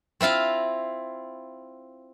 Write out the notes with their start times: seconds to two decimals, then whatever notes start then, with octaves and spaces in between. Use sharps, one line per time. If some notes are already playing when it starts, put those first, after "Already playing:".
0.21 C4 E4 F4 F5 A#5